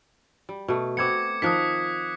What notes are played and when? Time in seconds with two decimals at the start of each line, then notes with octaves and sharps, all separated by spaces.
0.49 G3
0.68 B2 A3
0.97 B3 C4 F#4 D6 G#6 C#7
1.42 D#3 F3 A#4 D#6 F#6 B6